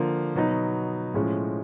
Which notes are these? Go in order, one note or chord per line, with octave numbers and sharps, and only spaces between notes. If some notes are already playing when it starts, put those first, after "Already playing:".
Already playing: D3 F3 A#3
B2 F#3 B3 D#4
A2 F3 G#3 C#4